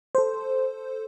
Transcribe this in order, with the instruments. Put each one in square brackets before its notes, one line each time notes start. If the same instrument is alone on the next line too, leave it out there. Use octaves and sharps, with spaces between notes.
[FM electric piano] A4 C5